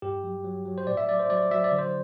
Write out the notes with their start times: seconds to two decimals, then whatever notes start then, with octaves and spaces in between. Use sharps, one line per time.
0.02 G2 G4
0.24 F#3
0.44 F#3
0.65 F#3
0.78 C5
0.87 A2 D5
0.97 E5
1.08 F#3 D5
1.19 C5
1.29 F#3 D5
1.51 F#3 E5
1.64 D5
1.72 D3
1.78 C5